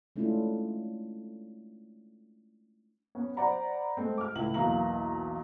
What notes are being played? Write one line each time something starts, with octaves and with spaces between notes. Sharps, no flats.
G#3 A3 C#4 D4 E4 F4
B3 C#4
C5 D5 F#5 A#5 B5
G#3 A3 C4
D6 F6
C#2 A2 E4 F#7
B1 E2 A#3 F5 A#5 F#7